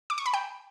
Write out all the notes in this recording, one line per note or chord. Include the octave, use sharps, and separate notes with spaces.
D6
C#6
B5
G5